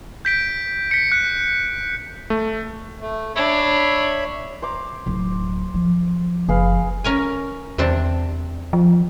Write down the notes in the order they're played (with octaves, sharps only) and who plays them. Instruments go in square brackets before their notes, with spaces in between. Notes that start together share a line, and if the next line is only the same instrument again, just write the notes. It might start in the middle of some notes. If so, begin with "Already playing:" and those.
[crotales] G6 B6 D7
B6 C#7
F#6 C#7
[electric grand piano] A3
[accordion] A3
[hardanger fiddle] D4 [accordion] C#5 E5 B5
[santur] C5 A#5 D6
[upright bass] D1
F3
[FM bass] F#1 [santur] G#4 B4 F5
[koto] C#4 A#4 G#5
[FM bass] E2 [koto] C3 C4 D4
[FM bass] F3